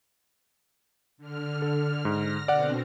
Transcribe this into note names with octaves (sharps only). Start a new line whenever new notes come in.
D3 F6
A4
G#2 F6 A#6
B2 D3 C4 D5 F#5